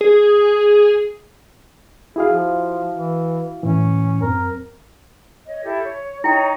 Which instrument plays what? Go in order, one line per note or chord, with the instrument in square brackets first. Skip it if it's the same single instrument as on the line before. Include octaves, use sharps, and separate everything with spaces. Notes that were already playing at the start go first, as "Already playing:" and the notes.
[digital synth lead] G#4
[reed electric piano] E4 F#4 F5 [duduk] G#4
[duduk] F3
E3
[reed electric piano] A2 E3 [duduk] C#4
[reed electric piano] F#2 C4 [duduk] A#4
[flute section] C#5 D#5
E4 G4 A4
C#5
[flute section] D#4 C#5 [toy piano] E4 G5